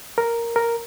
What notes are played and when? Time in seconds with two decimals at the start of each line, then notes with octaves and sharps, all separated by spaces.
0.18 A#4
0.56 A#4